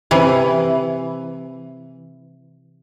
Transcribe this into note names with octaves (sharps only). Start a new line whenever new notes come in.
C3 E3